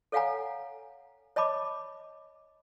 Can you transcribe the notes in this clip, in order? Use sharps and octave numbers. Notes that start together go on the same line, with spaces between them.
A4 C#5 F5 F#5 G#5 A#5
C#5 D#5 A5 B5 D6